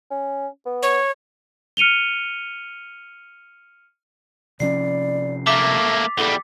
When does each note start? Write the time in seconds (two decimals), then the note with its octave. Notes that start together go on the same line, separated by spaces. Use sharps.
0.11 C#4
0.65 B3
0.82 C#5
1.77 F6 C#7 D#7 F7 G7
4.60 C3 F3 C#4 D5 C7
5.47 A3 A#3 E5 D6 A6 B6
6.18 E2 G3 A4